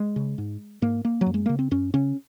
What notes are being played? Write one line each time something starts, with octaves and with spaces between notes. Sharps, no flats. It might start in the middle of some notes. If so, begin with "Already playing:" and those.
Already playing: G#3
C#3
G#2
G#2 A#3
A#3
F#3
F#2
G#3
C#3 A#3
C4
F#2 C#4
C#3 C#4